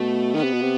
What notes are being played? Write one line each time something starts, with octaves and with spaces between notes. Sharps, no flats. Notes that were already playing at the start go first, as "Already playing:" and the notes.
Already playing: B2 A3
D#3 B3
C3
B2
C3